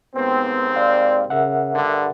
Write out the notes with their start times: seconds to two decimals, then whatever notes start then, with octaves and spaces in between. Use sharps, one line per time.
0.15 D#2 G#2 B3 C4
0.76 D5 F5
1.30 C#3 A#4 E5 F#5
1.74 G2 D3